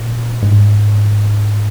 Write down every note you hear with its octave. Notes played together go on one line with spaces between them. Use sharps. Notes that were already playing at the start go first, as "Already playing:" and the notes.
Already playing: A#2
G#2